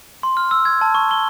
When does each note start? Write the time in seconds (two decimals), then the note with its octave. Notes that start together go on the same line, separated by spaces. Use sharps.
0.23 C6
0.37 F6
0.51 E6
0.65 G#6
0.81 A5
0.95 C#6
1.11 G7